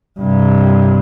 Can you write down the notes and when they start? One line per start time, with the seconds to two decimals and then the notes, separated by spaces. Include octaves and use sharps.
0.20 G2 C3